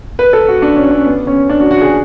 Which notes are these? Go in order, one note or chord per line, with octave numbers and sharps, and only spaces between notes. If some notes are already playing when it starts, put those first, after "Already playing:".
B4
A4
F#4
D4
C#4
C#4
B3
C#4
D4
F#4
F#4
G#4